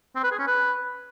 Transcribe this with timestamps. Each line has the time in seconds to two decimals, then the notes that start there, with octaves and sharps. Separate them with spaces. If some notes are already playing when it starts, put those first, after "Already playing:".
0.16 C4
0.24 B4
0.31 G#4
0.39 C#4
0.47 B4